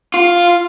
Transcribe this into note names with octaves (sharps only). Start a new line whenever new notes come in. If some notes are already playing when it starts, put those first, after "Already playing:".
F4